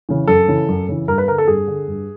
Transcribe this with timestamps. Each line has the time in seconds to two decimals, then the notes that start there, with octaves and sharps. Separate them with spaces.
0.09 C#3 E3
0.28 F#2 A4
0.48 C#3 E3
0.69 F#2
0.89 C#3 E3
1.08 G2 A#4
1.18 B4
1.28 D3 A#4
1.38 A4
1.48 G2 G#4
1.68 D3
1.88 G2